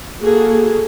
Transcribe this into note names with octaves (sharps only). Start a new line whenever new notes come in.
A#3 F#4 G#4 A4